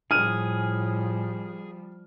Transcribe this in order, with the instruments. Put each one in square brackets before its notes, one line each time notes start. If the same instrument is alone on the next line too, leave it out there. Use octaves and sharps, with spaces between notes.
[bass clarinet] A2 [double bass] F3 G3 [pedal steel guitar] G#4 [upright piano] F6 D#7